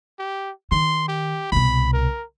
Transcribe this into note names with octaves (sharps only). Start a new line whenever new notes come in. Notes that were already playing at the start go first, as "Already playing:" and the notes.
G4
D#3 C6
G4
C2 B2 B5
A#4